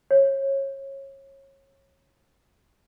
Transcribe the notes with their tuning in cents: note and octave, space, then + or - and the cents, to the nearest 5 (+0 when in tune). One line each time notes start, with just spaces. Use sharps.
C#5 -25